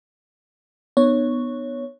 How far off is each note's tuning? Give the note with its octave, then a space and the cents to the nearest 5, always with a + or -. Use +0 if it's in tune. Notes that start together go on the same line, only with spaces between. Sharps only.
B3 +0 D#4 -40 C#5 +0